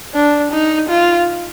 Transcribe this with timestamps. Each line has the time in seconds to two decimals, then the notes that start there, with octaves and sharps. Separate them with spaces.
0.15 D4
0.52 D#4
0.89 F4